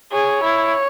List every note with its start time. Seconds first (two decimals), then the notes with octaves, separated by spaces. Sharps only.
0.12 G#4 C#5
0.43 E4